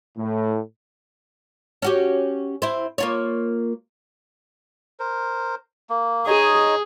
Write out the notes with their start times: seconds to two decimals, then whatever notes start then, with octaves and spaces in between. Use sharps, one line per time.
0.17 A2
1.82 C#4 F#4 G4
2.62 C4 E4
2.98 A#3 F4 C#5
5.00 A#4 C5
5.90 A#3
6.27 D#4 G#4 C#5 D#5